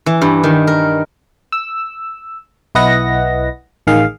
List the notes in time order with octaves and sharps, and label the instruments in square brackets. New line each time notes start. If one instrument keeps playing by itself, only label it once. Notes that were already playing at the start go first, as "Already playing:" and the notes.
[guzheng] E3
G2
D#3
A#4
[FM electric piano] E6
B1 E4 B4 D#5 F#5 A#6
A1 D#3 G#4 F5